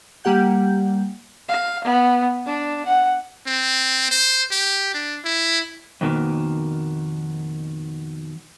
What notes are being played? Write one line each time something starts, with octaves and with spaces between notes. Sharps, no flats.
G3 A#3 G4 F#5 G6
F5
B3
D4
F#5
C4
C5
G4
D4
E4
F2 B2 D#3 A#3